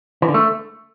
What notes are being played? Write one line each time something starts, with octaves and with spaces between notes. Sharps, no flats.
E3
D3
A3